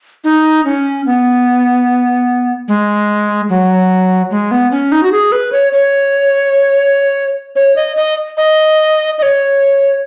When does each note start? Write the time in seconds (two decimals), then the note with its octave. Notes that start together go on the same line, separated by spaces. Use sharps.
0.24 D#4
0.65 C#4
1.06 B3
2.68 G#3
3.49 F#3
4.31 G#3
4.51 B3
4.71 C#4
4.92 D#4
5.03 F#4
5.12 G#4
5.32 B4
5.52 C#5
5.73 C#5
7.56 C#5
7.76 D#5
7.96 D#5
8.37 D#5
9.18 D#5
9.22 C#5